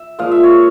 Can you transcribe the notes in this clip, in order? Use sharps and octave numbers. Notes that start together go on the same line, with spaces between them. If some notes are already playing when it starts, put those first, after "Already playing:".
Already playing: E5
A#2 F3 G#3 F5
E5
C#5